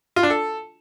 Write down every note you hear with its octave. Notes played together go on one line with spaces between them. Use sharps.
F4
D4
A4